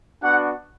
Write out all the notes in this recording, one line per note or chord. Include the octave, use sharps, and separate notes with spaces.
B3 D4 F#4 F#5